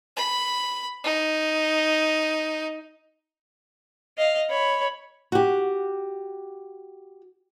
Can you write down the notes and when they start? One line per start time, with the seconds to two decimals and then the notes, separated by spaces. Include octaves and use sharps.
0.16 B5
1.04 D#4
4.18 D#5 F5
4.50 C#5 B5
5.32 F#4 G4